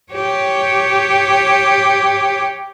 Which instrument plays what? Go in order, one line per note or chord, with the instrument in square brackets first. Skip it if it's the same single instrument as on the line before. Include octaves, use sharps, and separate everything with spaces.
[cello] G4 C#5